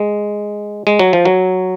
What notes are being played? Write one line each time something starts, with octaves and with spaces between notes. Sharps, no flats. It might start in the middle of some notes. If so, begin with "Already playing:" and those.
Already playing: G#3
G#3
F#3
F3
F#3